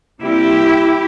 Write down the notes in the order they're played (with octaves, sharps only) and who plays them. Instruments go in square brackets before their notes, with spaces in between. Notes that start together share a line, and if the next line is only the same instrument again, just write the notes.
[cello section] C3 G3 A#3 E4 G4